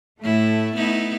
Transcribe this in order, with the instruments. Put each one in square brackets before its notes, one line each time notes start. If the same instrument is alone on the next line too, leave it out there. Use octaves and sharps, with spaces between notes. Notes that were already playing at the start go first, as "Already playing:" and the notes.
[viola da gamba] A2 E4 [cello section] A3
[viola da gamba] B3 D#4 E4